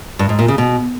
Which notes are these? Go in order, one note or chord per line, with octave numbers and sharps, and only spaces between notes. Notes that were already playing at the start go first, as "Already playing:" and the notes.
G2
G#2
A#2
C#3
B2